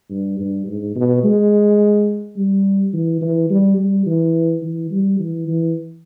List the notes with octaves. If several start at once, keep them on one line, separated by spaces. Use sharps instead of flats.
G2
G2
G#2
B2
G#3
G3
E3
E3
G3
G3
E3
E3
G3
E3
E3